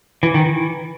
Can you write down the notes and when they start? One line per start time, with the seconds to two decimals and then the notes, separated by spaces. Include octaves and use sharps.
0.23 E3
0.34 D#3
0.46 E3